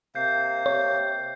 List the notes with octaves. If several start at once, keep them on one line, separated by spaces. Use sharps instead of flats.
C3 A#3 G6 C7
C3 C#5